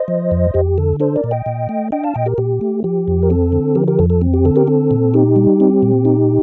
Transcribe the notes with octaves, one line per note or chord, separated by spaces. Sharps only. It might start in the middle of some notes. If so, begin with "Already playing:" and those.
Already playing: C5 D#5
F3
F2
F2 G4
D3 A4
D4 A4 C5
A#4 D5
A#2
D#5 G5
A#2
A3
D4 D#5 G5
F5 A5
A#2 D#5 G5
G4 A#4
A#2 G4
A3
F3 G4
F2
A#4
C4 A4
D3
F3 G4 A#4
G4 A#4
F2 A4
A4
C4
G4
D3 A4
G4 A#4
C4 A4
A#2
D#4 G4
G3
C4
A#2
D#4